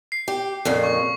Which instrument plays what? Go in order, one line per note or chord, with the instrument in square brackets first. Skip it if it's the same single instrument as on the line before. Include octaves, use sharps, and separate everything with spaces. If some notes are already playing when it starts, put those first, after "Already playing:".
[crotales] C7
[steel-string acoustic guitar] G4
F2 A#2 C#3
[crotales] C#6